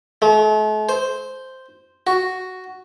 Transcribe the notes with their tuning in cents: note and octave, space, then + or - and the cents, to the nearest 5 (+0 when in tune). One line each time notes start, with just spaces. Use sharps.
A3 -45
C5 -5
F#4 +5